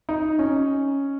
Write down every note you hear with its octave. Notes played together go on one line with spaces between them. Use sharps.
D#4
C#4